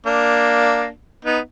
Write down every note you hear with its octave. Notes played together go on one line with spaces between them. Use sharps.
A#3 D4
B3 D#4